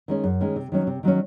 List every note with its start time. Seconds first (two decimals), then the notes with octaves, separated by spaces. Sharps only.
0.08 D#3 G#3 C#4
0.24 F#2
0.40 D#3 G#3 C#4
0.56 C3
0.72 D#3 F#3 C#4
0.87 C3
1.03 D#3 F#3 C#4